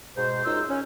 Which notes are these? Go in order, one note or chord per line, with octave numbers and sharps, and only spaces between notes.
G#2 B2 C5
F#2 G#3 D#4 F4 C5 E6
C#4